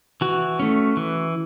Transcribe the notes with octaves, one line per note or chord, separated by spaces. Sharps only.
E3 F#4
A3 C#4
E3